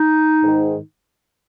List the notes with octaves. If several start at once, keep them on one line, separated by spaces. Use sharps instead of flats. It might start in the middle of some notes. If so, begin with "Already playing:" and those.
Already playing: D#4
G#2 D#3